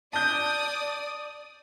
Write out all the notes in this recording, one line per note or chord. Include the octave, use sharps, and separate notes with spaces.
D5 A5 D#6 G6